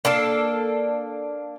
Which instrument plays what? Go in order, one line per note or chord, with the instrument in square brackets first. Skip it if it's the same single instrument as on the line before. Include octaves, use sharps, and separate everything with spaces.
[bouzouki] A#3 D4 A4